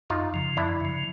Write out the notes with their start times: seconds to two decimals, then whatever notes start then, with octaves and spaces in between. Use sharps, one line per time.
0.10 F#2 D#4 F4
0.34 C#3 F3
0.57 F#2 D4 E4
0.80 C#3 F3